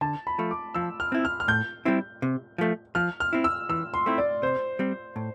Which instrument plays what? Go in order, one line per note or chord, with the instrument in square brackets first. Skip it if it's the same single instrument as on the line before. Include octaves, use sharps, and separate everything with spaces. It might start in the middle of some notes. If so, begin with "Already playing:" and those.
[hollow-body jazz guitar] D3 [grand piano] A5
[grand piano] B5
[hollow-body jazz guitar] F3 A3
[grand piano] D6
[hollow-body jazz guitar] F3 [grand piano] E6
[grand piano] F6
[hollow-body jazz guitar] C4 E4
[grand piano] F6
F6
[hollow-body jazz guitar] A2 [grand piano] G6
[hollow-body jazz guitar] G3 C4 E4
C3
F3 A3
[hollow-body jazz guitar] F3 [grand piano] F6
[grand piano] F6
[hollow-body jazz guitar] C4 E4
[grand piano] E6
[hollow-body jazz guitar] E3 [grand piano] E6
[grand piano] C6
[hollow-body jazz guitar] A3 C4 E4
[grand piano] D5
[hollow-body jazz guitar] C3 [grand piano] C5
[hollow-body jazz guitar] G3 C4
A2